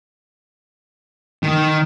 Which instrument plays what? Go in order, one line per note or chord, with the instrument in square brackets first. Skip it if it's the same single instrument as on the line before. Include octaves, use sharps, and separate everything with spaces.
[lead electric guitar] D#3